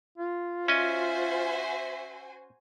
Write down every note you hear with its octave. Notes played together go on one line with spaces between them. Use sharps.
F4
C#4 F#4 C5 D#5 E5 G#5